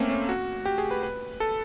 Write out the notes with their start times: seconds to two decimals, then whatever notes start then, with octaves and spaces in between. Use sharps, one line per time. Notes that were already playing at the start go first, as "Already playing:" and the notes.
Already playing: A3 A#3 C4 C#4
0.10 C#4
0.29 F#4
0.65 G4
0.78 G#4
0.91 B4
1.03 B4
1.40 A4